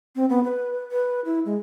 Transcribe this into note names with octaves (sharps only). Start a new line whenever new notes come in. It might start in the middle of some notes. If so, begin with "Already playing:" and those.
C4
B3
B4
B4
E4
G#3